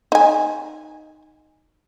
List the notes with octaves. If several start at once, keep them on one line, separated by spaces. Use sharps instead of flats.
D#4 G#5